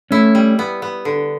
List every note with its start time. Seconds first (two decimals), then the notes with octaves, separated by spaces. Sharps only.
0.11 A3 C#4 E4
0.35 G3
0.59 B3
0.82 B3
1.05 D3